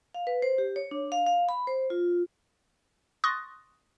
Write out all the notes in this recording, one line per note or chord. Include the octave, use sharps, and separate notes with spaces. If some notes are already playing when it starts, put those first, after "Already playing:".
F5
B4
C5
G4
C#5
D4
F5
F5
B5
C5
F4
C6 C#6 D#6 F#6 A6 A#6